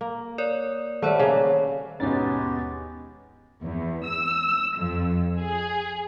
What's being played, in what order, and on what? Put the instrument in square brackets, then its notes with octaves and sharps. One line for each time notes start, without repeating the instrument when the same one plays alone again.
[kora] A#3
[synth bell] A#4 C#5 D5
[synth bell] D#3 C5 C#5 [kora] G3 A3
[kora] C#3 A#3
[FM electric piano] D#2 C#4 A6 [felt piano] G#2 B2 [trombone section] G#3 B3 G4
[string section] E2
E6
F2
G#4